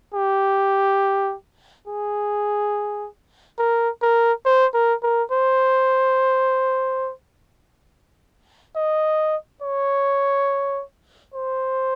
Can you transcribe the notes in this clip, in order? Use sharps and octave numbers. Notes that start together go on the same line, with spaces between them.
G4
G#4
A#4
A#4
C5
A#4
A#4
C5
D#5
C#5
C5